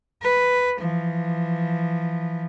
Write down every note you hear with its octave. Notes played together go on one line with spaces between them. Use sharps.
B4
E3 F3